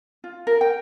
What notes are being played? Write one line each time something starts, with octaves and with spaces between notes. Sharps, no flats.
F4
A#4
G5